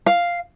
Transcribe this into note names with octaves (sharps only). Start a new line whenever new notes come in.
F5